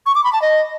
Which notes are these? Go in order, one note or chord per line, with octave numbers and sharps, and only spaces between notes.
C#6
D6
B5
A5
D#5